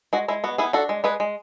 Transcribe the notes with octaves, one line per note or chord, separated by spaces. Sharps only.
G#3 F#4
G#3 E4
B3 F#4
B3 E4 G#4
D4 F#4 A4
G#3
G#3 G#4 B4
G#3